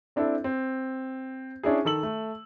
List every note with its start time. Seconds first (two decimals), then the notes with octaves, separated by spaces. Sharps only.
0.16 C4 D4 E4 A4
0.44 C4
1.63 C#4 D4 E4 G#4
1.85 D#3 A4 E6 F#7
2.03 A3